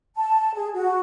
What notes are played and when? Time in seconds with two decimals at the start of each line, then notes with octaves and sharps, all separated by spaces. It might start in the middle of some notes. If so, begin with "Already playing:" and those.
0.16 A5
0.55 G#4
0.74 F#4